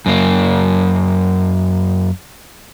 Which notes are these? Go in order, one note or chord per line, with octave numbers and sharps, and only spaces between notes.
F#2 A#3